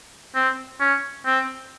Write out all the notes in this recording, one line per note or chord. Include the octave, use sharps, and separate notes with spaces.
C4
C#4
C4